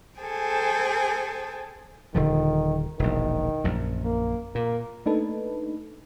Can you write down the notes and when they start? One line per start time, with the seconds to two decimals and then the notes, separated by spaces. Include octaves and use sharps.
0.21 G#4 A4 C5 G5 G#5
2.15 D#1 D3 D#3 F3
2.99 E1 A#1 D#3
3.64 A#1 F#2
4.05 A#3
4.55 A#2 A#3
5.06 A3 A#3 D4 D#4 A4 B4